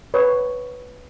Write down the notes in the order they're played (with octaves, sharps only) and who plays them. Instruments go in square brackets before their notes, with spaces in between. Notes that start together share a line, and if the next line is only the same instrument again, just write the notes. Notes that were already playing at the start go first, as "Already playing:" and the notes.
[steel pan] B4 C#5